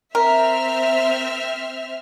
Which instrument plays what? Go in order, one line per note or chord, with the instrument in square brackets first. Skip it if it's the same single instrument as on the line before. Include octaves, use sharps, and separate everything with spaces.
[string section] C4 E5 F6 [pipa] A#4